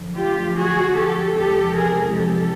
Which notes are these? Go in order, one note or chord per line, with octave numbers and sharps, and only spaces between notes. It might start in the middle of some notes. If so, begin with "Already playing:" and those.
Already playing: F#2 D3 F3 A3
F4 G4
F#4 G#4
G4 A4
E2 C3 F3 G#3 G4 A4
G#4 A#4
G4 A4